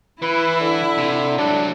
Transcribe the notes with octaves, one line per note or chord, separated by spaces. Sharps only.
E3 E4 B4
D3
C3
F#3 G3 D4